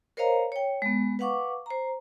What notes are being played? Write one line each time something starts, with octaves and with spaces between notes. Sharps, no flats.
A#4 C5 C#5 D#5 F5 A#5
C#5 G5
G#3 B3
B4 F5 F#5 C#6 D6
C5 A#5